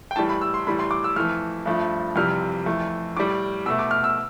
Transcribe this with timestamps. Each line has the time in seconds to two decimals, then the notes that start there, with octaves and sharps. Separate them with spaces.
0.11 G5
0.16 A2 E3 G3 A5
0.29 B5
0.41 E6
0.54 C6
0.67 A2 E3 G3 B5
0.79 C6
0.91 D6
1.04 E6
1.16 F2 E3 A3 F6
1.66 G2 F3 A3
2.16 F2 C3 E3 G3 F6
2.66 F2 E3 A3
3.17 A2 G3 D6
3.66 B2 E6
3.70 A3
3.79 D6
3.91 F6
4.04 E6